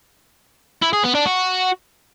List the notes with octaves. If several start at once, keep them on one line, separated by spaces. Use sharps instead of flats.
E4
G#4
B3
D4
F#4